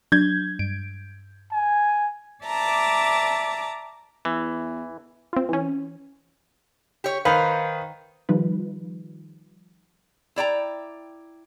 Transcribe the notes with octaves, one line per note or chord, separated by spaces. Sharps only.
F#3 D4 G6 G#6
G2 D7
G#5
D5 E5 A5 A#5 D6
E2 E3
C4 F4
E3 C#4
G4 C#5
D#3 B4 C5 F5
D#3 F3 G3 D#4 F4 B4
E4 D5 G5 A#5